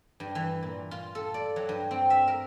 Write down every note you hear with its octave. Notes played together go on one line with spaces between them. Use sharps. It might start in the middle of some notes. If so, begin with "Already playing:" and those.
G2
E3
A#2
F4
A4
D5
F#3
G2
C4
E5
A#4